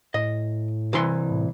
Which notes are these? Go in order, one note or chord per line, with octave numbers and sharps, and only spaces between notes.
A2 D#5
C2 E3 C6
A2